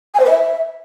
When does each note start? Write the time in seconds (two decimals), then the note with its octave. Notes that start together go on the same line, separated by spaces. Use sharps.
0.14 G#5
0.19 C5
0.24 B4
0.30 E5